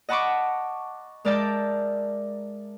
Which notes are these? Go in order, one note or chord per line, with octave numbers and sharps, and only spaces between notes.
D#5 F#5 A5 B5 C#6 D6
G#3 A#4 D5 E5 A5 G6